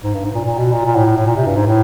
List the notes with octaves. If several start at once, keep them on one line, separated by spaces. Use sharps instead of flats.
G#2
G2
G#2
A#2
A#2
B2
A#2
A#2
A2
A2
A2
A#2
C3
G2
G#2
A2